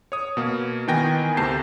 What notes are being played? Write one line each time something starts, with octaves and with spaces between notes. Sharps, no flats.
C#5 D#6
B2 A#3
D#3 E3 B3 G5 G#5 A#6
D2 C3 A3 A5 G6 C7